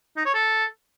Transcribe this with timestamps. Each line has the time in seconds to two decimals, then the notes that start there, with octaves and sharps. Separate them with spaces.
0.17 D#4
0.26 C#5
0.34 A4